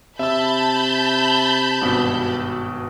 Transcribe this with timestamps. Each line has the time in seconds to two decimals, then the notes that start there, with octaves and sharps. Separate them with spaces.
0.19 C3 E5 A5 B5 E6 G6
1.81 G#1 G2 B2